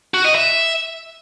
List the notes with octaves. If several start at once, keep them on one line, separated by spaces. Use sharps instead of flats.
F#4
D#5
E5